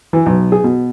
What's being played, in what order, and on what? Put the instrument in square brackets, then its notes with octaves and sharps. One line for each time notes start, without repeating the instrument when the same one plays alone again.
[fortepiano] E3
B1
G#4
B2